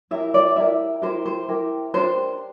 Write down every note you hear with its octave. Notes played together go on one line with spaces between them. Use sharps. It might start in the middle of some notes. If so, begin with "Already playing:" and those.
E4 G4 A#4 E5
D5
E4 G4 A#4 E5
E4 G4 A#4 C5
C5
E4 G4 A#4
D4 G4 A#4 C5